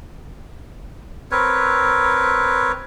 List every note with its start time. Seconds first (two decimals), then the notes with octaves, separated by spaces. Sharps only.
1.31 C4 A#4 B4 C#5